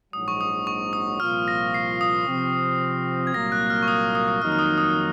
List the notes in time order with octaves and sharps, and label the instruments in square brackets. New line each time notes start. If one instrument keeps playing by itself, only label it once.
[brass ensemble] A#1 G#2 F#3 [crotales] D#6
[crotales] C#6
D#6
C#6
D#6
[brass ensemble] C2 A#2 F3 A#3 F4 [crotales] F6
[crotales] A#6
C7
D#6
[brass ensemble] C3 F3 C4
[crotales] G#6
[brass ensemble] C2 A#2 F#3 A#3 [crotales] A#6
[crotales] F#6
F6
C#6
D#6
D#6
D#6
[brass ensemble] F2 D#3 F#3 A#3 D#4 [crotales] F6
[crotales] F6
D#6
D#6